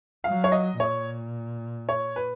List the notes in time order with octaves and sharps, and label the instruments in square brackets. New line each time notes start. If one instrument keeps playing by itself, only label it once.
[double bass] F#3 [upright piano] F5
[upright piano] C#5
D#5
[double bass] A#2 [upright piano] C#5
[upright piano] C#5
B4